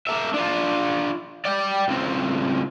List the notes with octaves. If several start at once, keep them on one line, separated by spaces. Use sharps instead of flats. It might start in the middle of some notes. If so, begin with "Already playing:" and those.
A#3 E5
D4 F4
D5 G5
C#2 C4